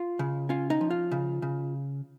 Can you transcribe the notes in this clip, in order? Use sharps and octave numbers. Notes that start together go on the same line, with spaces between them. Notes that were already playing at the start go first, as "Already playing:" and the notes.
Already playing: F4
C#3
C#4 F4
D#4
F3
F4
C#3
C#3